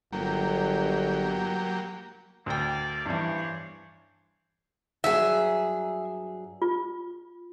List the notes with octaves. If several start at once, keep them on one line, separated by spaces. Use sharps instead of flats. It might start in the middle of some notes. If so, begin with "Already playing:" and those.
G1 F#3 A#3 G4
D2 A#3 D5 G5
G2 E3 D4 C5 C#5
G2 F#3 G#4 E5
F4